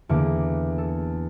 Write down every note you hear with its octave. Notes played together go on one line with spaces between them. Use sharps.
E2 D3 A#3 D6
A4